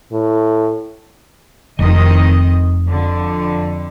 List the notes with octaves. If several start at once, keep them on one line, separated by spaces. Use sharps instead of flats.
A2
F1 D#3 C4 D#5
F2 D3